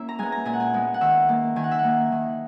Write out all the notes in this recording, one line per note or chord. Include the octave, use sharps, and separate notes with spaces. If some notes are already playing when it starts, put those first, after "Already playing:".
Already playing: A#3 C#4 E4 E5
A#5
G#3 B3 G#5
A#5
A#2 G#5
F#5
G#5
G#3 B3
F#5
D#3 E5
A#3
D#3 G#5
F#5
E5
F#5
A#3
D#3